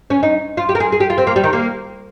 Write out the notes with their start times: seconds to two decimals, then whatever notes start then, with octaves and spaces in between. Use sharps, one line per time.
0.10 C#4
0.23 D#4
0.57 F4
0.69 G4
0.75 A#4
0.80 G#4
0.92 G#4
1.00 G4
1.10 F4
1.18 C4
1.27 A#3
1.36 G3
1.44 D#3
1.53 A#3